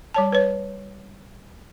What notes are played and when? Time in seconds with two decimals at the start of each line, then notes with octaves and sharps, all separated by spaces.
0.14 G3 C#5 A5
0.32 B4 C#5